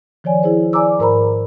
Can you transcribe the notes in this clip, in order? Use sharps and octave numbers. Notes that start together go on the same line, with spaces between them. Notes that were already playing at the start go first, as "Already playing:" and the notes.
D#3 F3 C#5 D5 G#5
E4 G#4 C5
D5 G#5 A#5 D6 E6
G#2 A#4 C5 A#5 B5